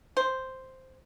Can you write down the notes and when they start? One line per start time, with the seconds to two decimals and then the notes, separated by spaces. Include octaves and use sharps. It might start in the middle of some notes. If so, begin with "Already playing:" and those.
0.17 C5